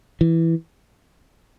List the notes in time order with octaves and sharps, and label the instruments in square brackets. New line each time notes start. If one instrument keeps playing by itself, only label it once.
[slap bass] E3